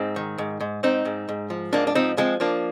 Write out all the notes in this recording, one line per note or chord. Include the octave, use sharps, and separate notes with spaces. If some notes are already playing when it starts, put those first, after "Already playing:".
Already playing: G#2 C4 D#4
D#3
G#2
G#2
G#2 C4 D#4
G#2
G#2
F3
G#2 A#3 D4
D4
F3 C4 D#4
F3 G#3 C4
F3 A#3 D4